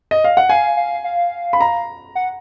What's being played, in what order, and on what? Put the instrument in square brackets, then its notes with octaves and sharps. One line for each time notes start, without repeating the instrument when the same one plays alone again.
[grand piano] D#5
F5
F#5
[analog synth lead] F5 [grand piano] G#5
[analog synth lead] F5
F5
[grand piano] B5
A#5
[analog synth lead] F#5